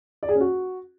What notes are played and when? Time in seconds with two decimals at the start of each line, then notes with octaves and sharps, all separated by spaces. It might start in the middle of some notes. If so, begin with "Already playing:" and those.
0.23 D5
0.29 G#4
0.35 C#4
0.41 F#4